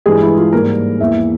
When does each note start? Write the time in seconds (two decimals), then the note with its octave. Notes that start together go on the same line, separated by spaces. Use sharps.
0.06 G2 E3 G#3 G#4
0.21 E4
0.37 F4
0.52 G#2 G3 A#3 A#4
1.00 E2 E3 A#3 E5